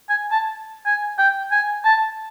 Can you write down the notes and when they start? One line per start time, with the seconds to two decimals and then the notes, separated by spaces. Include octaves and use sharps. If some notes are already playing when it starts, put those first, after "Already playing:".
0.09 G#5
0.32 A5
0.86 G#5
1.19 G5
1.51 G#5
1.85 A5